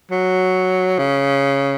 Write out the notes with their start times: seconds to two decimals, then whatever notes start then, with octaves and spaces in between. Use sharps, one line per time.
0.11 F#3
0.98 C#3